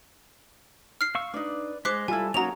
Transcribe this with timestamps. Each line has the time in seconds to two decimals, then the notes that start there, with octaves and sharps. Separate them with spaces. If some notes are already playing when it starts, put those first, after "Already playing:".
1.01 F6 C7
1.15 F5 C#6 E6
1.34 D4 D#4 B4 D5
1.85 G#3 C5 D6 F#6 B6
2.08 G3 E4 F4 A4 G#5
2.34 F#3 A#3 C#4 D#4 F#4 C#5 A#5 F7